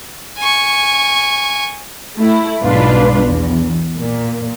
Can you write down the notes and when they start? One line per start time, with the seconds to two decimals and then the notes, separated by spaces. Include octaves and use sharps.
0.38 G#5 C#6
2.18 A3 E4
2.63 B1 G#2 B2 D4 F4 B4
3.24 E2
3.98 A#2